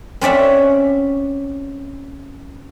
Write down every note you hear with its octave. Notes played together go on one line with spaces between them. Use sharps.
C4 C#4 D5 E5 F#5